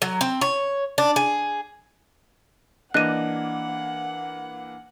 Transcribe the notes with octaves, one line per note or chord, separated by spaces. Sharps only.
F#3
C4
C#5
D4
G#4
E3 A#3 D4 D#5 F#5 F#6 D#7